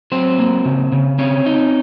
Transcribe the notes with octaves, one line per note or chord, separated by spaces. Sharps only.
F#3 C4 C5
A#3
C#3
C#3
C4 C#4 C#5
D#4